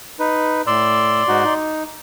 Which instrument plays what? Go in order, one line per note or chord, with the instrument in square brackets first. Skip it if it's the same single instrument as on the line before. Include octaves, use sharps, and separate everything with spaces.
[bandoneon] D#4 B4
[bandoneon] A2 E6 [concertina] D5 C6
[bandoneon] G#2 D#4 F#4
D#4